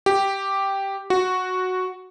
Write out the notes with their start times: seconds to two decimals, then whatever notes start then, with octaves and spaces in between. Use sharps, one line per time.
0.06 G4
1.10 F#4